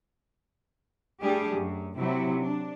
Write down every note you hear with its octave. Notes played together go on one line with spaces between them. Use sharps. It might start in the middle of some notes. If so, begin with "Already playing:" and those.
G3 A3 D4 G4 G#4
F#2
C3 F#3 E4
D4